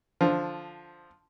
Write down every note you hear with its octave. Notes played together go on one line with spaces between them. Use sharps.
D3 F3